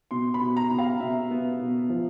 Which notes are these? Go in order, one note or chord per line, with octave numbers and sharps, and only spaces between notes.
B2 C6
B5
B2
A#5
B2
F5
B2 E5
B3
B2
F3